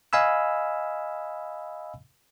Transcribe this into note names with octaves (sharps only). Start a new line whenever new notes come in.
D#5 F5 G#5 B5 E6